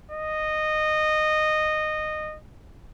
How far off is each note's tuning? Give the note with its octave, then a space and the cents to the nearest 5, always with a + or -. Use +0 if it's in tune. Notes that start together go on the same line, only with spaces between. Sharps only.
D#5 -15